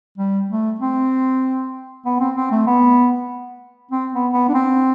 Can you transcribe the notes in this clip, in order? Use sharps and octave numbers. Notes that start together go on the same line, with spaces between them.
G3
A3
C4
B3
C4
C4
A3
B3
C4
B3
B3
D4
C4